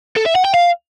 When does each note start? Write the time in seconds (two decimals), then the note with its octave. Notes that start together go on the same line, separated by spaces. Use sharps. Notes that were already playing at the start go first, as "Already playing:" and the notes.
0.16 A4
0.26 E5
0.35 F#5
0.45 G5
0.54 F5